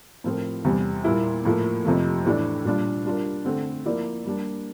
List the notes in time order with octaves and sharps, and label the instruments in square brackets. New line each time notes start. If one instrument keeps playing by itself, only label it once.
[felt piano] A2 F3 C4 F4 A#4
E2 C3 G3
A#2 G3 A#3 E4
A2 F3 A#3 E4
F2 C3 F3 A3
A2 E3 A3 D4
A#2 G3 D4 F4
G3 D4 F4 A#4
D3 A3 C4
F3 A#3 E4 A#4 D5
G3 A#3 D4